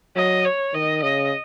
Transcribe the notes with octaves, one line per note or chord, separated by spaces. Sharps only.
F#3 D#5
C#5
D#3 D#5
C#3 D#5